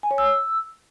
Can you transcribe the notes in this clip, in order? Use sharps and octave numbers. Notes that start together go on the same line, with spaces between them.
G#5
C#5
E6